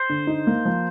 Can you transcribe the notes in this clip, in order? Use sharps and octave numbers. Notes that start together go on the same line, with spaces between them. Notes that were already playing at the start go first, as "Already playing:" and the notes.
Already playing: C5
D3
D#4
A#3
F3